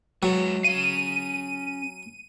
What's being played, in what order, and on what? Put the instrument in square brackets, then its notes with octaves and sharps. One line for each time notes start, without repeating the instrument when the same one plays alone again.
[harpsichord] F#3 [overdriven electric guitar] G#3 B4
[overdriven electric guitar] C#4 F5 [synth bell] D#7